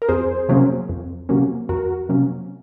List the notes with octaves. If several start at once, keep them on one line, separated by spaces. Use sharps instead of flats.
A#4
F2 G#4 C5
C3 F#3 A#3 C#4
F2
C3 F#3 A#3 C#4
F2 F#4 A#4
C3 F#3 A#3 C#4